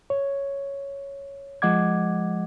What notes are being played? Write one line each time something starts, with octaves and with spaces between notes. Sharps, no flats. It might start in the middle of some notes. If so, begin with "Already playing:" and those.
C#5
F3 G#3 D#5 F#5 D6 G#6